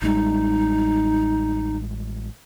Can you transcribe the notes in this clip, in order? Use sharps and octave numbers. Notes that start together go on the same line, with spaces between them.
A1 G3 G#3 D#4